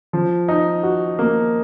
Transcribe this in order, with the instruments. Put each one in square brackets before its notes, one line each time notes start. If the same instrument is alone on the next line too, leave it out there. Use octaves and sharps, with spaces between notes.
[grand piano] F3
D#4
F#4
A#3